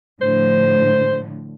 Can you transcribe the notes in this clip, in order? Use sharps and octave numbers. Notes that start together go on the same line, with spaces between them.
A2 D3 F3 C5